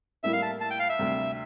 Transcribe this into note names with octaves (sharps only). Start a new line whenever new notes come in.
A2 G3 A#3 E4 E5
F5
A5
A5
G5
F5
E5
D2 C3 G3